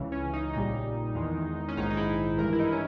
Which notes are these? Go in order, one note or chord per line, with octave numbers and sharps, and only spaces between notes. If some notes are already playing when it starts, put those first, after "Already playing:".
Already playing: C#2 C#3 E3
C#4
D#4
A#1 A#2 G3 D#4
E2 D#3 G#3
C#4
A#1 G#2 D#3 G#3 D#4
D#4
E4
G2 E3 G#3 A#4
E4
D#4
C#4